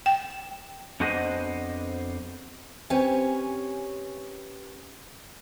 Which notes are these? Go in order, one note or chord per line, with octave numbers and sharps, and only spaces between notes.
G5
F2 B3 D4 F#4 C5 D#5
C4 C#4 G4 B4 C#5 G#5